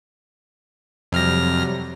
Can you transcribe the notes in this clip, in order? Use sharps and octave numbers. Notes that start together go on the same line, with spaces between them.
F2 C3 F#3 G3 F6 A#6